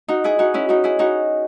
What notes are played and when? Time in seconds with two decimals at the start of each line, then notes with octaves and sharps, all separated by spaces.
0.08 D#4 F#4
0.24 E4 G#4
0.39 D#4 F#4
0.54 C#4 E4
0.69 D#4 F#4
0.84 E4 G#4
0.99 D#4 F#4